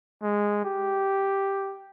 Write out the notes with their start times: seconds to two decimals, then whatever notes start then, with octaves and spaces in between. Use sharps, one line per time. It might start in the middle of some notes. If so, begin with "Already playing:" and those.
0.23 G#3
0.65 G4